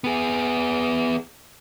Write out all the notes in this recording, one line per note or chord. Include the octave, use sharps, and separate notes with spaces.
B3 G#4